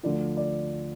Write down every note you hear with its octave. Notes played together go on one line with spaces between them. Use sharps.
D2 D3 F3 D5
D5